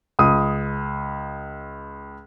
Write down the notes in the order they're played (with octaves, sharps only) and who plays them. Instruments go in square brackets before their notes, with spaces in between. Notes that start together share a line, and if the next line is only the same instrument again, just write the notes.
[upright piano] C#2 D#6